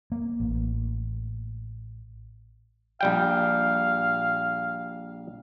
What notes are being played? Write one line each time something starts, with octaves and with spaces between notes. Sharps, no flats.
A#3
A1
A#1 G3 F5 G5